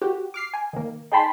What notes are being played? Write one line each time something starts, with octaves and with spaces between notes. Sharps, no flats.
F#4 G4
D6 F6 C7
G#5
D#3 A#3
D#4 G#4 G5 A5 B5 C6